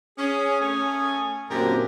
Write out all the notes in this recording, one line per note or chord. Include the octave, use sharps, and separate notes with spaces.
C#4 G#4 D#6
A3 C#4 G#5
F#2 A#2 D3 C4 D4 G4 A#4